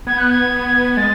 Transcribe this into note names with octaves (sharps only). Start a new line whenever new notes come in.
B3 G#6
F#6
G#6
G#3 A6